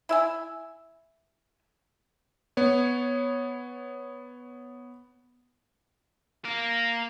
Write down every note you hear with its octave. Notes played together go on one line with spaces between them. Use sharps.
E4 E5 G#5
B3 C#5
A#4 F5